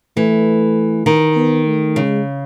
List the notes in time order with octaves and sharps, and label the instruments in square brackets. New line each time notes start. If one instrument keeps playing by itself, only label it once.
[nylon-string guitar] E3 [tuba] A3
[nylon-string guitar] D#3
[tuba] B3
A3
[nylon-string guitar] C#3 [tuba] G#3